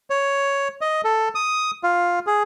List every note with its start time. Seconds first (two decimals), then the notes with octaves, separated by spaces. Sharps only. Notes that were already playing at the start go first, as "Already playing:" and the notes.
0.10 C#5
0.81 D#5
1.04 A4
1.35 D#6
1.83 F4
2.27 G#4